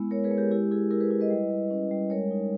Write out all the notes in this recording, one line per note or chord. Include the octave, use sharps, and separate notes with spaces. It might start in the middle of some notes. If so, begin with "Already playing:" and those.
Already playing: G#3 B3 E4
G#3 A#4 C#5
G#4 B4
G#3
G4 A#4
E4 G4
E4 G#4
E4 G4 A#4
G#4 B4
E4
B4 D#5
G3
G3
C#4
G3
G#3 A#4 C#5
D#4